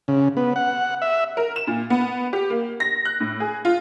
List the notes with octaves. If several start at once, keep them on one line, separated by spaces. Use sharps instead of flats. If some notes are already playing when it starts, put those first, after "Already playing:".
C#3
B3
F#5
E5
A#4
E7
A#2
B3
G4
A#3
A#6
F#6
A2
G#4
F4